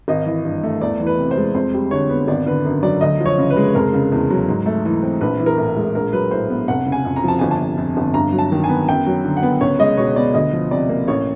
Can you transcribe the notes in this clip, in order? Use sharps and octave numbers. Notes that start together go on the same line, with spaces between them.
G#1 D#5
E3
G2
A3
E2 D5
E3
B4
C3
C5
G#3
F2 C5
G3
D3 C#5
B3
G#1 D5
D3 B4
F#2
F#3 D5
D2 D#5
F3
C#5
C#3
B4
G#3
F1 A#4
C#3
E2
F#3
G#2
A3
E3
C4
A#1 B4
E3
A#4
A2
G#3
A#1 A#4
F#3 B4
A2 C5
B3
F1 F#5
C#3
G#5
F2
A#5
F3 A5
G1 G#5
A5
C3
F2
G1
G2 A#5
F#3
A5
D#3
G#5
B3
F#2 G5
F#3
D3
F#5
B3
C#2 C#5
G#3 D#5
B2 C#5
B3 D5
D2 D#5
F3
C3 D5
A#3
A1 C#5